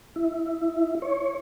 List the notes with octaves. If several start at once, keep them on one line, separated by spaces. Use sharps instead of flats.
E4
C#5